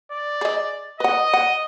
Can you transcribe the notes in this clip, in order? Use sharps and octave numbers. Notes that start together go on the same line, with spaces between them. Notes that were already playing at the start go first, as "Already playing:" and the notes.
D5
G#4 D#5
B4 D#5 F#5
F#5